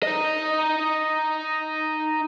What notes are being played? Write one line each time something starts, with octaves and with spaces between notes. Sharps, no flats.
D#4 D#5